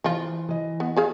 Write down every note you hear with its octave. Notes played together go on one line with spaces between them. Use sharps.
E3 F3 F4
E3 D#5
B3
F3 G#4 F5